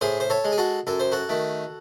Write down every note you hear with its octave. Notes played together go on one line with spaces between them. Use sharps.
A2 G#4 C5
C5
A4 C#5
G#3
G#4
F#4 A4
F#2 A4
C5
F#4 A4
D#3 A3